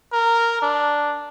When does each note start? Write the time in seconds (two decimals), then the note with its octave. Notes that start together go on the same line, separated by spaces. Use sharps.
0.13 A#4
0.62 D4